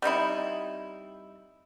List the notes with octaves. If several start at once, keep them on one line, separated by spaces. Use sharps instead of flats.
G3 C4 D#4 E4